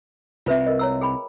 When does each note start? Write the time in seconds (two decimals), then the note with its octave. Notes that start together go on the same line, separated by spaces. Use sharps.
0.46 C2 C4 F4 B4 E5
0.66 A#4 D#5
0.79 C#5 A#5 E6
1.01 G#4 G5 B5